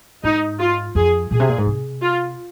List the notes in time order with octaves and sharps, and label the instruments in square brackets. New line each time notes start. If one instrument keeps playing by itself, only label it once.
[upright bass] G#2 [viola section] D#4
[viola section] F4
[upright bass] F2 [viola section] G#4
[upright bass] A#2 [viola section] G#4
[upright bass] C3
A#2
G#2
C3
[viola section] F4